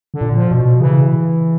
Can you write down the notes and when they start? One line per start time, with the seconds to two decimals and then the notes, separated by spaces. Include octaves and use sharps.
0.14 D3
0.21 A#2
0.36 F3
0.51 B2
0.81 C#3 E3